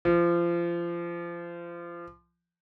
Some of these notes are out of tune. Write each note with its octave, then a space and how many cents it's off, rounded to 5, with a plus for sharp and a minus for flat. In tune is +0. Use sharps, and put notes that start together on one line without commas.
F3 -25